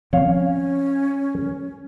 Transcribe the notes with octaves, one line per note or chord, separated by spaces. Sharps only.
F3 C4 C#4 C#5 F5